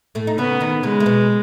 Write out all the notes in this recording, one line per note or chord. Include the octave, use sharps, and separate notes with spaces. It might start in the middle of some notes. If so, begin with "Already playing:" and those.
A2 A3
D#4
C#3 B3 C#4
D#3 D#4
C#3 G#3 C#4
A3
B2 B3